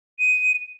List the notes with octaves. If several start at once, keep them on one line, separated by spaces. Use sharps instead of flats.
D#7